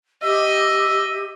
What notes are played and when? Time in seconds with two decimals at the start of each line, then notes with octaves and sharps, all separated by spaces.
0.23 G4 D#5 E5